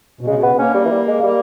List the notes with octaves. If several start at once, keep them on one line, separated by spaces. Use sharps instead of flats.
B2
C#3 G#3
B2
C#3 B3
A#3 C#4
G3
E3
G3
G#3
G3 A#3